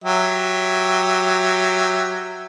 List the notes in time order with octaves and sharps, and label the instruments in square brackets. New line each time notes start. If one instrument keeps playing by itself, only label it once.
[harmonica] F#3 G4 E5